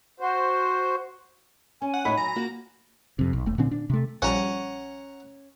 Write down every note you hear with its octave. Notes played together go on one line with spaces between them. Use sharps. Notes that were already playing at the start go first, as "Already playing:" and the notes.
F#4 C5
C#4 G#5
F#5
A2 D#4 C#5 B5
F#3 A#5
A#3 F#4
F2 C3
B1
F1 A3
A#2 D3 C4 D4
D4
C3 A3
A#1 F3 G3 C#4 F#5 A#5